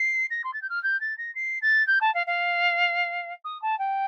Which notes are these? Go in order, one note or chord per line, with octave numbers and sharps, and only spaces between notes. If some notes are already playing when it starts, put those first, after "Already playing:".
Already playing: C7
A#6
C6
A6
G6
F6
G6
A6
A#6
C7
A6
G6
A5
F5
F5
D#6
A5
G5